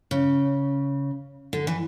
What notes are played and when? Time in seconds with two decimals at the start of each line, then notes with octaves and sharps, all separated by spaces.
0.11 C#3
1.53 D3
1.67 E3